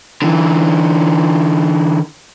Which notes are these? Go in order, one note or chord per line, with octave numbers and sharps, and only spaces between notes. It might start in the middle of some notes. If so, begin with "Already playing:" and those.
D3 E3